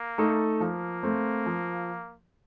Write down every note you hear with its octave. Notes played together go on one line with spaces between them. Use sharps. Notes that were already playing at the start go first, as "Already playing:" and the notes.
Already playing: A#3
A3 D#4 A4
F3 A#3
A3 C4
F3